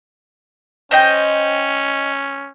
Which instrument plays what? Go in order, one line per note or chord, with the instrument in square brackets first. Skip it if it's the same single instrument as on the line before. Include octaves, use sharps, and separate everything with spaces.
[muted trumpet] C#4 [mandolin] C5 D#5 G5